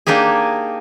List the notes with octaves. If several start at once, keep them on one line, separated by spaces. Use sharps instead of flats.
A#3 D4 D#4 G4 G#4